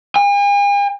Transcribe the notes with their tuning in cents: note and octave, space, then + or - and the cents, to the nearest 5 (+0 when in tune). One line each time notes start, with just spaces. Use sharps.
G#5 -45